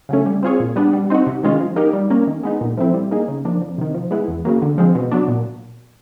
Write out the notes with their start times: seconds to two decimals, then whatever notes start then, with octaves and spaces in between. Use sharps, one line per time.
0.09 C#3 F#3 A3 C#4
0.26 G3
0.43 C4 F4 G#4 C#5
0.60 A#2
0.76 G3 B3 D4
0.93 G3
1.10 C4 D#4 F#4
1.27 C3
1.43 D#3 G#3 C#4 F4
1.60 F3
1.76 A#3 D#4 G4 A#4
1.93 G3
2.10 A#3 C#4
2.27 D#3
2.43 G#3 B3 D#4
2.61 A#2
2.77 F3 A3 C4 E4
2.94 G3
3.11 A#3 D#4 G#4
3.28 C#3
3.45 F3 A#3 D4
3.62 F2
3.78 C3 D#3
3.94 F3
4.11 G#3 B3 E4
4.28 E2
4.45 C#3 F#3 A#3
4.62 D3
4.78 F3 G#3 C4
4.95 B2
5.11 F#3 B3 D4
5.28 A#2